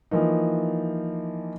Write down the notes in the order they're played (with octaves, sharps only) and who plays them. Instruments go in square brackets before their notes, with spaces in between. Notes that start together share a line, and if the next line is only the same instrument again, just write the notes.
[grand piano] E3 F3 A#3 D#4